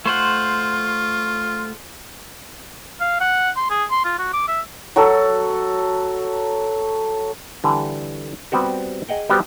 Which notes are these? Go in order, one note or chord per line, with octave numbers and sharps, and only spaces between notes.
A3 F4 C5 F#5
F5
F#5
C6
G#4
C6
F4
F#4
D6
E5
F#3 F#4 A4
D3 E3 G3
G3 B3 C4 F#4 G4
G#4 D#5 F#5 G5 A#5
G3 B3 F#4 G4 C5